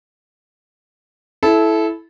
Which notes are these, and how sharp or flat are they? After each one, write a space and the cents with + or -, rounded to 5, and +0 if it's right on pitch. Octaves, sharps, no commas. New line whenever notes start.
E4 +0 A4 -20